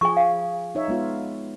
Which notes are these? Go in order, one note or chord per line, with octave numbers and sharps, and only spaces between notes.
F3 G#4 G#5 C#6
F5
D#4 C#5 E5
G#3 B3 F4